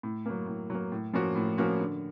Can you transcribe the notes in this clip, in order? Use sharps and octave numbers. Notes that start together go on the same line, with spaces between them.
A2
F#3 A#3
A2
F#3 A#3
A2
F3 A#3 C#4 F#4
A2
F3 A#3 C#4 F#4
D3